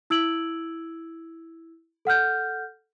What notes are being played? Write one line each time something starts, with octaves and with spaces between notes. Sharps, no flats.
E4 E6 G#6 D7 F#7
A4 F#5 F6 G6